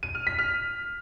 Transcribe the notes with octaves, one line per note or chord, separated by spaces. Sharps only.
D#7
F6
B6
F6